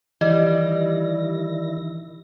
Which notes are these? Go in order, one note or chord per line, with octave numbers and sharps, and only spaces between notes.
D#3 E3 G3 E4 D#5 A#6